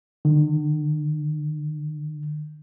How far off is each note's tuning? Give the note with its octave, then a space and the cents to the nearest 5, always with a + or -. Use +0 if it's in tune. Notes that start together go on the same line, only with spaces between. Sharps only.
D3 +45